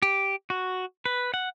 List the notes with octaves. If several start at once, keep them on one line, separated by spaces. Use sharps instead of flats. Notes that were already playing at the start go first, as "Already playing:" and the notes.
G4
F#4
B4
F#5